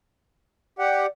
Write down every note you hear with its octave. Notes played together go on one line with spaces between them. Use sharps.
G4 D5 F#5